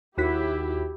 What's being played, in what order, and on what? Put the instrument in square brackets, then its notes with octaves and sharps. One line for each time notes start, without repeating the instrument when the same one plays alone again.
[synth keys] D#2 F#4 B6 [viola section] E4 G4